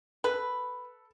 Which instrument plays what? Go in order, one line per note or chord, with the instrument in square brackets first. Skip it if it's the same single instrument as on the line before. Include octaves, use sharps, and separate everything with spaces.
[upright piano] A4 [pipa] B4